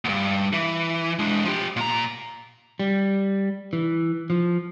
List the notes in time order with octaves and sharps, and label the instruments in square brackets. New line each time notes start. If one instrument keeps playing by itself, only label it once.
[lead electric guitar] D2 G2
E3
G#3 D4
F3 G4
A#2 A#5
[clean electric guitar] G3
E3
F3